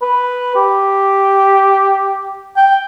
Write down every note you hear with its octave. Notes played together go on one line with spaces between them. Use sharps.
B4
G4
G5